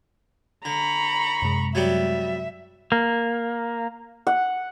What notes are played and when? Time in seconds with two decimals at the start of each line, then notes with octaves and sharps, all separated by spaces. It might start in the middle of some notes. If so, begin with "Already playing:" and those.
0.65 D3 A#5 B5 C#6
1.42 F#2 C3 G#3
1.75 F#3 G3 B3 E5
2.92 A#3
4.27 F#5